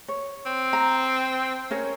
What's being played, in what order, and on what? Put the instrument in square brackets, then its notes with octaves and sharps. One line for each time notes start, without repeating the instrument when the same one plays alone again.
[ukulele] C#5
[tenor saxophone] C4
[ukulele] A#5
C#4 A#4 C#5